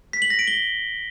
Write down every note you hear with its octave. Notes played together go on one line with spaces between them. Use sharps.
B6
F#7
A#6
D7
G7